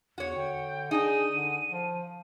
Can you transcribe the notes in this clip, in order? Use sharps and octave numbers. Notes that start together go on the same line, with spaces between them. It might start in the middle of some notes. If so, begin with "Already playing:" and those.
E2 F#4 C#5
D3 G5
D4 D#4 G#4 D#7
D3
F3